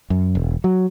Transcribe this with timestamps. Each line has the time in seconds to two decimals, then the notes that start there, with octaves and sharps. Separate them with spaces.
0.10 F#2
0.35 E1
0.64 F#3